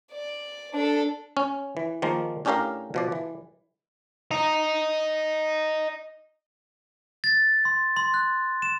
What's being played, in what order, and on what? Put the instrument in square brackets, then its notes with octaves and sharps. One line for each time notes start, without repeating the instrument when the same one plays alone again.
[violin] D5
D4 A4
[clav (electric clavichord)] C#4
E3
D#3 F3 G#3 A#3
A2 C#4 D4 G4 A#4 F5
B2 F3 D5
E3
[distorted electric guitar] D#5 A#5
[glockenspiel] A6
C6
C6
F#6
E7